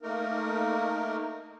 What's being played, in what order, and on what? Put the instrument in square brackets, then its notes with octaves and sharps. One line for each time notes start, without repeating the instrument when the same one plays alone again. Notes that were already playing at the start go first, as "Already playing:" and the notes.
[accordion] A3 A#3 D#4 A#4